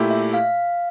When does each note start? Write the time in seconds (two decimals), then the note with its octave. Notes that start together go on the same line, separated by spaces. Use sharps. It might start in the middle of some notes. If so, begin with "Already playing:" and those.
Already playing: A#2 A3 E4 G4
0.11 E5
0.34 F5